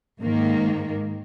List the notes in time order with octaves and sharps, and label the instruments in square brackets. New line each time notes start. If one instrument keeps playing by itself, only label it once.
[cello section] G#2 D#3 A#3